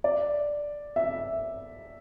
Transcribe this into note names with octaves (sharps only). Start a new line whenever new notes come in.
D5
E5